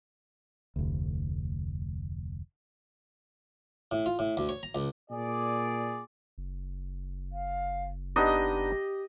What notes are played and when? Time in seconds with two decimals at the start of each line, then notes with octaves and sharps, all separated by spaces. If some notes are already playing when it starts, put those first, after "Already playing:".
0.76 F1 D2
3.92 A2
4.06 F4
4.19 A2
4.37 D2
4.49 C#5
4.63 A#5
4.75 C#2
5.10 A#2 G#4 D5
6.38 F#1
7.32 F5
8.16 B3 D4 D#4 G4 D#5